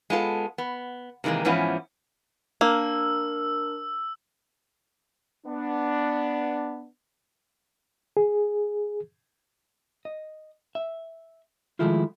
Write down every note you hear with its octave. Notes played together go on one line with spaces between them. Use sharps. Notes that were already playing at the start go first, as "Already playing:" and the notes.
G#3 B3 F4 A4
B3
C3 D#3 E3 G#3 A#3
G#2 E3 F3 B3 C#4 E4
A#3 D4 A#4 E6
B3 D4
G#4
D#5
E5
D#3 F3 G#3 A3 E4 F4